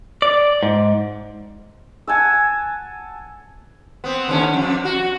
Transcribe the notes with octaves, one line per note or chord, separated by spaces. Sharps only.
D5
G#2
F#5 G#5 A5 E6
B3 C4
D#2 D3 C#4
F2
F#4